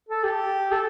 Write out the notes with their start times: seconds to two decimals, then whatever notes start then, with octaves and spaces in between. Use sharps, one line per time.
0.09 A4
0.23 G4
0.71 A4